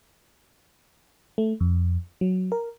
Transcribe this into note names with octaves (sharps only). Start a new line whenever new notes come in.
A3
F2
F#3
A#4